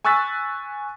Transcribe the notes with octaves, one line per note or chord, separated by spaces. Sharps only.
G#5 C#6 E6 F#6 A6 B6